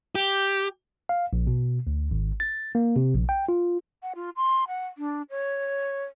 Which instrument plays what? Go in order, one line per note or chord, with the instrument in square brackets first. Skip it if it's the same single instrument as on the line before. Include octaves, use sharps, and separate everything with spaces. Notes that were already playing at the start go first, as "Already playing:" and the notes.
[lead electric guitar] G4
[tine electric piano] F5
A#1
B2
D2
G#1
A6
A#3
C3
A#1
G5
F4
[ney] F#5
F4
C6
F#5
D4
C#5